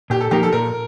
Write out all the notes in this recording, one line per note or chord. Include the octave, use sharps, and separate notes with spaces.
A#2 G4
A4
F3 A#3 D#4 G4 A#4
A4
A#2 A#4